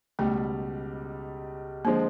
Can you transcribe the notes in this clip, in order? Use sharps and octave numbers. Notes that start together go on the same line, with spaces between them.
C#2 B2 G3 A3
D3 F3 G#3 A#3 C4